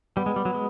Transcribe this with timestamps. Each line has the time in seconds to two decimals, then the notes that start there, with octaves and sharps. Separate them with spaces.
0.17 G3 B3
0.26 G#3
0.36 G3
0.45 F#3
0.54 G#3